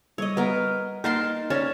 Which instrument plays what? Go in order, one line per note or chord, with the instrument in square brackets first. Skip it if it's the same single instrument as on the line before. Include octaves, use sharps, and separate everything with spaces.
[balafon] G3 [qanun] C#5 D#5
[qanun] B3 A#4
[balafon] A#3 D#4 D#5 [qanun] A#4 A5 C6
[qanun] C#4 A5 [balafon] C#5 D5